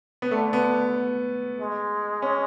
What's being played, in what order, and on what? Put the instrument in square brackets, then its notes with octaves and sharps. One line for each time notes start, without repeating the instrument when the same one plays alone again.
[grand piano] B3
[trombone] D3 [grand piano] A3
[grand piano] B3
[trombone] G#3
[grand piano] C#4